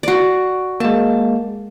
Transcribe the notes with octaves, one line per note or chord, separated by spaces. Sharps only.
F#4 D5
G#3 A#3 A5